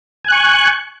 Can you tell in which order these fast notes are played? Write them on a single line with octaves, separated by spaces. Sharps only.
G#5 F#6 C#6